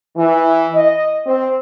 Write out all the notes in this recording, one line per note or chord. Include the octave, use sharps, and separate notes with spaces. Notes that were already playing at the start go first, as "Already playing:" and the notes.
E3
D#5
C4